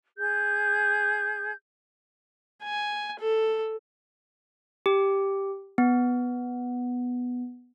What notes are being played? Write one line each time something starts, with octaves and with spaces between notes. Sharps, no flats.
G#4 G6
G#5
A4
G4
B3